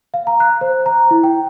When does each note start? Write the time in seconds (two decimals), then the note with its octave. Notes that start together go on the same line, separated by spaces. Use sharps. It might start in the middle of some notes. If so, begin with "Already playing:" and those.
0.14 F5
0.27 A#5
0.40 F#6
0.61 C5
0.86 A#5
1.11 E4
1.23 G5